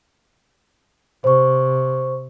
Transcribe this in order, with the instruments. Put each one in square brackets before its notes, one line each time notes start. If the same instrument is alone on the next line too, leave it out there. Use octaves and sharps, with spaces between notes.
[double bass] C3 [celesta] C5 C#6